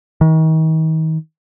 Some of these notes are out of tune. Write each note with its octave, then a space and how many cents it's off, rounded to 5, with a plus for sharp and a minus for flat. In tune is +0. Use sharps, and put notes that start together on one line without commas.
D#3 +35